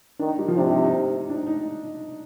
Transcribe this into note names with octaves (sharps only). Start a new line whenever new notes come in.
D#3 D4
D#4
G3 G4
F3 F4
C3 D4
D#4
D#4
D#4
D4
D#4
D#4